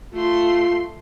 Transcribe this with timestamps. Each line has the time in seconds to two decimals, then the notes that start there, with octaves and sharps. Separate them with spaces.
0.14 A3 F4 C6